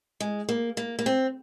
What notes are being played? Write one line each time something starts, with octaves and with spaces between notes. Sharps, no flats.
G#3
A#3
A#3
A#3
C4